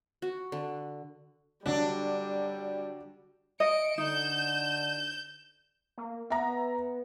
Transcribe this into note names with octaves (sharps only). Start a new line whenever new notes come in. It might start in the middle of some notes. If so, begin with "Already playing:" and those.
F#4
D3
D3 F#3 G3 D4 F#4
D#5 C#7 D7
D3 D#4 G6 E7
A#3
B3 E5 A#5